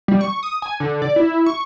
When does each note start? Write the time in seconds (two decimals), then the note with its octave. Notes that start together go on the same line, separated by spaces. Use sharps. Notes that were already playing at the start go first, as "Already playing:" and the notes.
0.08 G3
0.21 C#6
0.43 D#6
0.62 G#5
0.80 D3
1.02 D5
1.16 E4
1.46 C#6